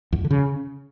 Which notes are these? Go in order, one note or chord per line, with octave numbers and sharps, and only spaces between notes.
E2
F2
D3
C#3